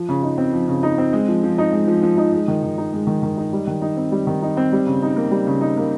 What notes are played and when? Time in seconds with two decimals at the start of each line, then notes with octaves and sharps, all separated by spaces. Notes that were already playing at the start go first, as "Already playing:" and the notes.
Already playing: F3
0.09 C#3
0.23 D#4
0.38 C4
0.53 F3
0.68 C#3
0.83 D#4
0.98 C4
1.13 G#3
1.28 F3
1.44 F3
1.58 D#4
1.73 G#3
1.87 F3
2.03 F3
2.17 D#4
2.33 G#3
2.48 D#3
2.63 D#3
2.78 D#4
2.93 G#3
3.07 D#3
3.23 D#3
3.37 D#4
3.53 G3
3.67 D#3
3.82 D#4
3.96 C4
4.12 G3
4.27 D#3
4.42 D#4
4.57 C4
4.72 G3
4.87 C#3
5.02 D#4
5.16 A#3
5.31 G3
5.47 C#3
5.61 D#4
5.77 A#3